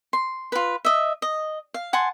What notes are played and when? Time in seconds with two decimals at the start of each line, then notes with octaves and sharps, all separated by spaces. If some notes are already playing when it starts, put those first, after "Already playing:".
0.13 C6
0.52 F4 B4
0.85 D#5 E5
1.22 D#5
1.74 F5
1.93 F#5 G#5 A5 C6